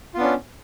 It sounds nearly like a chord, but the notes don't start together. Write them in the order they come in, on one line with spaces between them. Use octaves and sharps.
F4 B3 D4 C#4